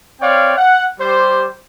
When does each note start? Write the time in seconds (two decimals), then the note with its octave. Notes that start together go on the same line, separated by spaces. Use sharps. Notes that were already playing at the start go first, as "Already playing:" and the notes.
0.22 C4 C#5 D5 F5 G5
0.57 F#5
0.99 G3 G4 C5